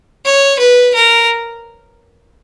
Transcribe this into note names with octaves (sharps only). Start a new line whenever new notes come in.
C#5
B4
A#4